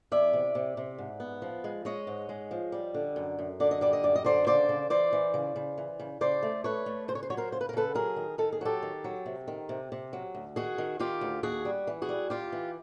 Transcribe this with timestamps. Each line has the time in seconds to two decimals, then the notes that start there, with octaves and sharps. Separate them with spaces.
0.12 E2 D5 E5
0.33 C3
0.55 C3
0.77 C3
0.98 G#2
1.20 B3
1.42 F3
1.64 G#3
1.85 G#3 C#5 D#5
2.07 G#2
2.29 G#3
2.51 F3
2.72 G3
2.94 D3
3.16 F#2
3.39 F#2
3.60 D3 D5
3.71 D#5
3.81 G3 D5
3.93 D#5
4.03 F#2 D5
4.15 D#5
4.24 D3 C5 D5
4.47 C#3 C5 D5
4.69 C#3
4.90 E3 C5 D5
5.13 E3
5.34 C#3
5.56 C#3
5.78 E3
6.00 C#3
6.21 C#3 C5 D5
6.43 A3
6.64 A3 B4 C#5
6.86 A3
7.08 C#3 C5
7.15 C#5
7.23 C5
7.30 F#3 C#5
7.37 A#4 C5
7.52 C#3 C5
7.61 B4
7.69 A#4
7.73 C#3 A4 B4
7.95 F#3 G#4 A#4
8.16 D#3
8.38 D#3 A4
8.53 G#4
8.61 F#3 G4 A4
8.82 D#3
9.04 F#3
9.26 C3
9.48 D#3
9.69 C3
9.92 C3
10.13 F#3
10.35 D2
10.56 D#3 F#4 G#4
10.78 D#3
11.00 D#3 F4 G4
11.21 D2
11.43 D#2 F#4 G#4
11.65 G3
11.87 E3
12.02 F#4 G#4
12.09 G3
12.30 D#2 F4 G4
12.52 E3